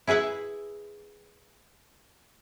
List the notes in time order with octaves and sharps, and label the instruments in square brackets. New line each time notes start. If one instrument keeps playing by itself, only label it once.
[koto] E4 G#4 B4 E5 F#5